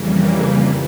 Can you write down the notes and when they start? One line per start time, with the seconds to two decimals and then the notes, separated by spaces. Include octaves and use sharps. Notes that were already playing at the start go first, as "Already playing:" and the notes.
Already playing: F2 C#3 E3 G3 A#3
0.36 B4